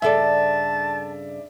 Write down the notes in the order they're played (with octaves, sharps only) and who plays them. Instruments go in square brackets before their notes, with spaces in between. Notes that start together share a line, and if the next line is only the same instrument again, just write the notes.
[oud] G2 C#3 A4 [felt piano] D5 E5 [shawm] A5